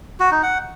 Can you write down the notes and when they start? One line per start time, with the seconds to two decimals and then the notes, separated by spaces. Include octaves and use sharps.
0.20 F#4
0.31 D#4
0.43 F#5